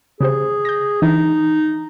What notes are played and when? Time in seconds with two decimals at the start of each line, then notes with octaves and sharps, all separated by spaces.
0.21 C#3 G4 G#4 C5
0.65 G6 A#6
1.02 E3 D4 D#4 D#5